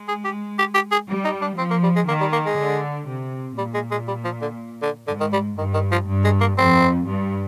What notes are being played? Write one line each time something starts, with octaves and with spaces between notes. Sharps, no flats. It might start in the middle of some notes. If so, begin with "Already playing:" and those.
Already playing: G#3
G#4
G4
G4
G4
G#4
G3
D#4
D4
F3 C4
A#3
G3
G#3
D#3 A#3
G3
A#3
G#3
D3
C3
A#2 G3
G#3
G#3
G3
F3
D3
D3
G#2 D3
D#3
G3
G2 D#3
D#3
F3
G2
G#3
A#3
F2 C4
G2